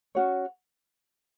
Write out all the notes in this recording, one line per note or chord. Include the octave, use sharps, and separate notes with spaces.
C#4 F#4 C#5